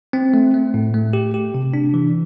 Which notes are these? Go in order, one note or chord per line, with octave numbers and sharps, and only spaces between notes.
C4
A3
A3
A2
A3
G4
G4
C3
D4
E3